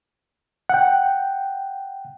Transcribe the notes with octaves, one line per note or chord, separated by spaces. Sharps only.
F#5 G5